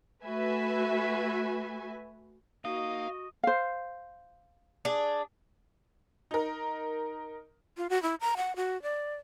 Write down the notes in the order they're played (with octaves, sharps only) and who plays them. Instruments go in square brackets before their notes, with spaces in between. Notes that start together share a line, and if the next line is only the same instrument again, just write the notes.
[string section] A3 F#4 B4 E5 G#5
[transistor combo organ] A#3 D#4 [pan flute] F#4 [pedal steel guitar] D#5 [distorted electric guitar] F5
[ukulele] C5 F5
[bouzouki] D4 G#4
[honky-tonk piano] D#4 A#4
[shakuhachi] F4
F#4
E4
A#5
F#5
F#4
D5